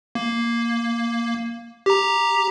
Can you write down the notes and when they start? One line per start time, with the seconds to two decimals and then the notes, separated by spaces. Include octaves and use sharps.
0.15 A#3
1.86 G4 A#5